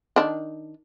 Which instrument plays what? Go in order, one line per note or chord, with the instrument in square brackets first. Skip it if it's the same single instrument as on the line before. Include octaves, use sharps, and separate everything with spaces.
[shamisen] D#3 D4